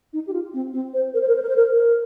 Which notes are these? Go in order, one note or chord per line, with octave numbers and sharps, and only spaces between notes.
D#4
G4
F4
C4
C4
C5
A#4
C5
A#4
C5
A#4
C5
A#4
A#4